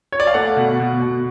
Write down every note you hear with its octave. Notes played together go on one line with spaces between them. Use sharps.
C#5
D5
F5
A3 F#5
B2
B2
B2